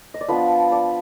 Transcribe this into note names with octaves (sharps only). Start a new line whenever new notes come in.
D#5
D5
F3 B3 D4 B4
D5